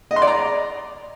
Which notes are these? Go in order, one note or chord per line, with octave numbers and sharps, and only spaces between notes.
D#5
C6
D5
A#5